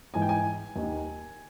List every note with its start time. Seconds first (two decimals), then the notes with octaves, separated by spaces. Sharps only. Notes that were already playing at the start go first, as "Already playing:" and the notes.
0.14 G#2 E3 G#5
0.22 G5
0.29 G#5
0.76 D#2 D#3